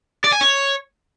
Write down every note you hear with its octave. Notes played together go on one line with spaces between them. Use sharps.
D5
G#5
C#5